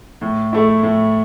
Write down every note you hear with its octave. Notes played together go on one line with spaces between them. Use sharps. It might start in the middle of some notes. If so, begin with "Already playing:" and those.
A2
A3 E4
A2